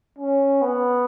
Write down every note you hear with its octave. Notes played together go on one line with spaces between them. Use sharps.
C#4
B3